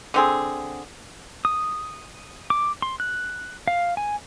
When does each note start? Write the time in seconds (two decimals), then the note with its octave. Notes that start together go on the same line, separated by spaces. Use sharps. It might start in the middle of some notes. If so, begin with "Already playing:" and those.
0.14 D3 C4 G#4
1.45 D#6
2.50 D6
2.82 C6
3.00 F#6
3.67 F5
3.97 G#5